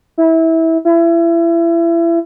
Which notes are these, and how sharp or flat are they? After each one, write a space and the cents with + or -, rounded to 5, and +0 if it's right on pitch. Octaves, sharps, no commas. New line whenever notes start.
E4 -20
E4 +30